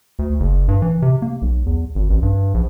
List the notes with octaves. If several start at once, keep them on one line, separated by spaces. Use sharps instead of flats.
D2
F#1
G2
E3
C3
A#3
B1
E2
G#1
A1
G2
A#1